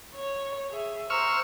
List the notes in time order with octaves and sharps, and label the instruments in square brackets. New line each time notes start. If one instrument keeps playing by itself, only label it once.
[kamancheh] C#5
G#4 E5
[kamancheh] C5 A#5 [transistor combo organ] C#6 E6 F6